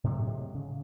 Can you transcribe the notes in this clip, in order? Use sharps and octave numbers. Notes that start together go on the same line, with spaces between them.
A2 C3 F#3 G#3
C#3